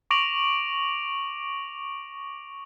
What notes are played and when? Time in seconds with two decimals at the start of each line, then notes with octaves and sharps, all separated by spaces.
0.11 C#6 D6 A#6 D7 F7 F#7